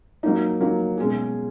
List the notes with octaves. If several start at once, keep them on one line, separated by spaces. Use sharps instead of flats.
F#3 A#3 D#4
F#3 A#3 D#4
B2 G#3 C#4 G#4